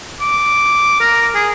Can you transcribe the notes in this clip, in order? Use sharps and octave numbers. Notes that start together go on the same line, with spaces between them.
D6
A#4
G#4